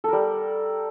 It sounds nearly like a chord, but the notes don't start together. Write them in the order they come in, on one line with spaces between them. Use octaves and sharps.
A4 A#4 G3